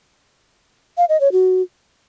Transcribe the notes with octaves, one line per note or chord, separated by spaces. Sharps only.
F5
D#5
C#5
F#4